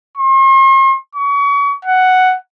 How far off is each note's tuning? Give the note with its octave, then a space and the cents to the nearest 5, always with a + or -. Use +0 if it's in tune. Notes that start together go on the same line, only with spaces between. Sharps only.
C6 +45
C#6 +35
F#5 +5